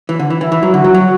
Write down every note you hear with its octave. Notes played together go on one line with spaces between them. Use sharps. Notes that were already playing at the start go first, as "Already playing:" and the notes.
E3
D3
E3
E3 E4
E3
F#3
D3 F#4
F#3
F#3